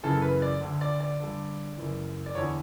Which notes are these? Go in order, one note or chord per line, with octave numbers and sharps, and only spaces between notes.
F#2 C#3 E3 A4
B4
D5
D2 D3
D5
D5
G2 D3
F#2 C#3 E3
D5
E2 D3 C#5